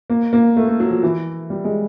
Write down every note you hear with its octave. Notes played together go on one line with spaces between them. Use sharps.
A#3
A#3
A3
A3
F#3
F3
E3
G3
G#3